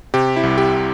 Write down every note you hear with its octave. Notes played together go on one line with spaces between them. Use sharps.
C3 G4
E4
C2
G4